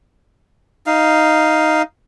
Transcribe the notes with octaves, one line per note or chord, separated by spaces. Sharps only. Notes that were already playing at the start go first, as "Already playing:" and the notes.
D#4 F5